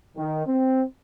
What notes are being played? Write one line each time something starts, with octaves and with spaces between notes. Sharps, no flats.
D#3
C4